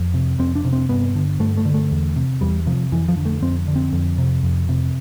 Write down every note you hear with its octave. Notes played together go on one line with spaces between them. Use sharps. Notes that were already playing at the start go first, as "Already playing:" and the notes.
Already playing: F2
C3
F2 C4
D4
C3
C4
G2 B3
D3
G2 A3
A3
D3
A3
E2
C3
E2 G3
C3 F3
F2 E3
F3
D3
A3
F2 C4
D3
C4
F2
C3
F2
C3